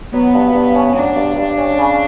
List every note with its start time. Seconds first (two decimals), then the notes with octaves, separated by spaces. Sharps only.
0.13 F#3 B3
0.34 G2
0.55 G2
0.75 C#4
0.96 F#3 D4
1.16 G2
1.37 G2
1.58 C#4
1.78 C#3